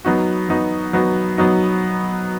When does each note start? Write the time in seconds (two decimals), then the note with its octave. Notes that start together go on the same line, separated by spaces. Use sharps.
0.05 F#3 B3 D#4 F#4
0.49 F#3 B3 D#4 F#4
0.93 F#3 B3 D#4 F#4
1.38 F#3 B3 D#4 F#4